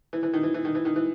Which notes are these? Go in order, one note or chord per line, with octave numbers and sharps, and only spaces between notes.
E3
E3
D#3
E3
E3
D#3
E3
D#3
E3